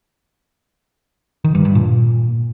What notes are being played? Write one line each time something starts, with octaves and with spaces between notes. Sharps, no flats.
D#3
G2
G2
A#2